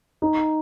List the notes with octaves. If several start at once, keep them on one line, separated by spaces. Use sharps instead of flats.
D#4